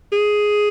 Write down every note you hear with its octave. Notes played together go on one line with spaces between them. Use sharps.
G#4